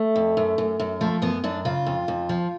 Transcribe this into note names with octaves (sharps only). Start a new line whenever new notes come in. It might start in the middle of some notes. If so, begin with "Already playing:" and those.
Already playing: A3
F2
F#2
F#2
F#2
F3 A3
F#2 B3
F#2 D4
C#3 F4
F2
F2
F3